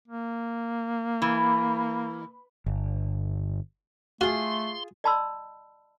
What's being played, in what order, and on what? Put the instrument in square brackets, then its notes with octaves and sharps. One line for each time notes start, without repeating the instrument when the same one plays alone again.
[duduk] A#3
[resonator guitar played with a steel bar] E3
[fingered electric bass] G1
[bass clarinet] A3 [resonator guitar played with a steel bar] F4 G#4 [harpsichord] F#4 [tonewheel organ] C6
[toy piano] D5 D#5 A5 B5 C6 E6